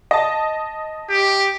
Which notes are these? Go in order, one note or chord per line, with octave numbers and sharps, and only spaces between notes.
D#5 A5
G4